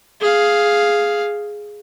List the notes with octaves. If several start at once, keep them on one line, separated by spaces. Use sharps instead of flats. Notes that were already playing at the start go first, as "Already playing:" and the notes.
G#4 F5